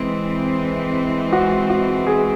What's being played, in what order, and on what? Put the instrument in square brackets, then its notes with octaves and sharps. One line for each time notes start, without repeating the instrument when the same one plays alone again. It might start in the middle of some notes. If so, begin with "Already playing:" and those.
Already playing: [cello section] E3 G#3 C4
[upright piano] F#4
F#4
G#4